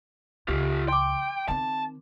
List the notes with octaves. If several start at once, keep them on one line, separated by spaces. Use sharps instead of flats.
C#2 F4 G4
G5 C6 D6
D#3 C4 A5